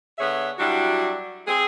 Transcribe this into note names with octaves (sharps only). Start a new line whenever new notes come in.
D3 B3 G#4 C#5 E5
F#3 G3 D4 E4 F#4
C4 G#4